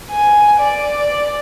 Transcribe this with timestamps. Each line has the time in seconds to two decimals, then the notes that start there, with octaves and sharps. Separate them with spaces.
0.11 G#5
0.60 D5